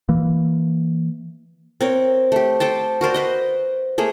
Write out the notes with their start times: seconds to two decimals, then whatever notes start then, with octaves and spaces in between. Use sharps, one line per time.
0.09 E3 A#3
1.81 C4 A#4 C#5
2.32 A3 G4
2.60 A4 C5 G5 A5
3.01 F#4 A#4 C5 D5
3.14 B4 C5 D#5
3.98 A3 A#3 G#4